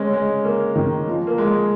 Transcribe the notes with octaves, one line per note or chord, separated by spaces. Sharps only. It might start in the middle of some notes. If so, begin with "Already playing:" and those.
Already playing: G#3 C#4
G#3
A#3
D#3
F3
A#3
G#3